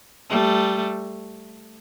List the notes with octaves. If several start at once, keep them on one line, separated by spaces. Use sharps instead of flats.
G3 A3